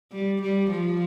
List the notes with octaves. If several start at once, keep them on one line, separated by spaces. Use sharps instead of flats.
G3
G3
F3